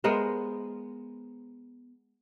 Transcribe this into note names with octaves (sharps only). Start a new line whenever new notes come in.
G#3 B3 A#4 C5